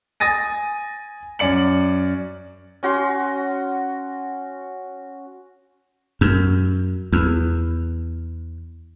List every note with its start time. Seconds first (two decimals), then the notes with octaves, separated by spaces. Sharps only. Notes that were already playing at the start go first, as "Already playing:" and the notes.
0.20 G#5 D#6 A6 A#6 D#7
1.39 F#2 D5 C#7 F#7
2.83 C#4 F#4 C6
6.21 F#2
7.13 E2